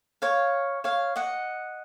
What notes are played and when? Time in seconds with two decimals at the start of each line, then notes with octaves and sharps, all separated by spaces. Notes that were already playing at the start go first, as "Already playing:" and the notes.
0.22 C#5 F5
0.84 C#5 F5
1.16 D#5 F#5